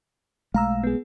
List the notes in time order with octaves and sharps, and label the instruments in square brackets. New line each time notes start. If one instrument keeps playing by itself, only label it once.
[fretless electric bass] B1 G#3 A3 [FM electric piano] F5 A#5 E6
[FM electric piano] B3 G#4